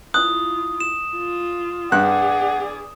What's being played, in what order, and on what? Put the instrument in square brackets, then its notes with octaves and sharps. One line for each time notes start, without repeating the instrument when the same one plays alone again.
[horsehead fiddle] E4 F4 [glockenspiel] D#6 [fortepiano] F#6
[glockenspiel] E7
[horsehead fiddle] F4
[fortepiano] G2 F#6 [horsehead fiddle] G#4 D5 [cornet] F#5